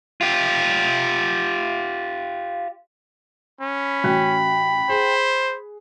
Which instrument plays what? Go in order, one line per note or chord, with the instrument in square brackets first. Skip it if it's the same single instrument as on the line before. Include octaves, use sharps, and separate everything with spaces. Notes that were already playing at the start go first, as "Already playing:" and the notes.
[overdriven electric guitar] F4 G4
[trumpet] C#4 [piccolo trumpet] B5
[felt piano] A1 F#4 F#6 [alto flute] G5
[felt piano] G#4 [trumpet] C5